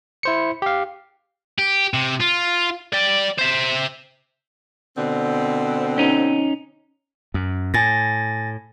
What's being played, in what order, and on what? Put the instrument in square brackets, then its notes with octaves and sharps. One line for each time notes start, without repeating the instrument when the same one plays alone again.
[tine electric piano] E4 C5 C#7
G4 F5
[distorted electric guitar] G4
C3
F4
D5 G5
C5 E5
[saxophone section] B2 D3 C4
[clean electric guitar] C#4 D#4
[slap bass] F#2
[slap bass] A2 [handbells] G#5 A6 A#6